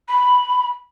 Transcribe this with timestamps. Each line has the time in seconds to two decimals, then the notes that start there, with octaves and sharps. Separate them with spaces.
0.08 B5